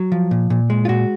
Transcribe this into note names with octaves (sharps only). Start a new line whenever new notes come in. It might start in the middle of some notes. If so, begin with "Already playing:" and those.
Already playing: F#3
F3
A#2
A#2
G#3
F4
A#2 F#4